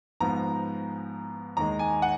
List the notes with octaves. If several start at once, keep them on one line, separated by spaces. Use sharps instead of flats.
G#2 F3 B3 A#5
D#2 D#3 G#3 A#5
G#5
F#5